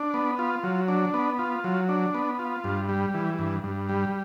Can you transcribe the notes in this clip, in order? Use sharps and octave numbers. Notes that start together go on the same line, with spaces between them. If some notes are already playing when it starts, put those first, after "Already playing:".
Already playing: D4
B3
F4
F#3
D4
B3
F4
F#3
D4
B3
F4
G2
G3
E3
G2
G2
G3